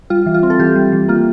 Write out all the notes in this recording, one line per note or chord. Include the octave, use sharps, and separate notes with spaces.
G3 F4
E3
F4
C4
A4
E3 G4
G3
E3
A#3 F4